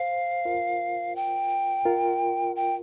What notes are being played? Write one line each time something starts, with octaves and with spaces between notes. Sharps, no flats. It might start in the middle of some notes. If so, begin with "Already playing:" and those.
Already playing: C5 F5
F4 A#4
G5
F4 A#4
G5